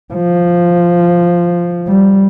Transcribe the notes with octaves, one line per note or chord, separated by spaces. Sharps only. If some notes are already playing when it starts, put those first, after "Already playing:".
F3
G3